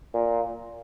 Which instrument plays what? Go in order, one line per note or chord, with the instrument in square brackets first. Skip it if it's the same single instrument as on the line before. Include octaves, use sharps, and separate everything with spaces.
[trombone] A#2